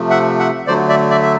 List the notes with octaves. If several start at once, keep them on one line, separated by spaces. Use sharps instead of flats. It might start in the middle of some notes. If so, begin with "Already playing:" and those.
Already playing: C3 F3 A3
E5 F#5
E5 F#5
D3 F#3 A3 C5 D5
D5 E5
D5 E5
E5